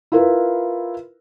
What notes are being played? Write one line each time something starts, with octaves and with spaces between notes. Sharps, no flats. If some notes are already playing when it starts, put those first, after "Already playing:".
E4 F4 A#4 B4